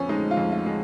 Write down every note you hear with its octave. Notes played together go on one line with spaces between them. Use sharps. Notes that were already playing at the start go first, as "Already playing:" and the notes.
Already playing: F2 F3 B3 C#4
G#3 D#4
F4
F2
F4
G#3